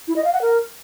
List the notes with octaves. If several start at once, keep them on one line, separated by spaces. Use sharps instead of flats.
E4
D#5
F5
F#5
A#4